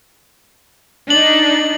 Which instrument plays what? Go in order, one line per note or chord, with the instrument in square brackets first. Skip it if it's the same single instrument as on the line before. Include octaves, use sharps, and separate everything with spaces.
[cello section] D4 D#4 [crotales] F#7